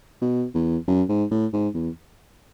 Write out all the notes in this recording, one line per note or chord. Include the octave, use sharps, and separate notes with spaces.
B2
E2
F#2
G#2
A2
G#2
E2